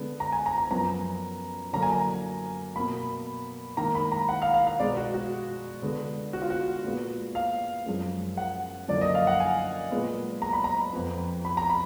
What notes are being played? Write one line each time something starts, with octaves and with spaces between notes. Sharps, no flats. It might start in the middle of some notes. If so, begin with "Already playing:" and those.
Already playing: D3 G#3 B3
A#5
G#5
A#5
A#5
F#2 F3 B3 A#5
D3 F#3 A#3 A#5
G#5
A#5
B2 A#3 B5
G#2 D#3 A#3 A#5
B5
A#5
F#5
F5
F5
F5
B2 G#3 B3 D5
F#4
F#4
D3 G#3 B3
F#4
F4
F#4
A#2 G#3 B3
F5
F#2 F3 G#3
F#5
F#2 D3 F3 A#3 D5
D#5
F5
F#5
G#5
A#2 G#3 B3
A#5
B5
A#5
F2 F3 B3
B5
A#5
B5